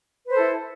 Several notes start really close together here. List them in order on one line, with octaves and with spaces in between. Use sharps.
B4 C5 A4 E4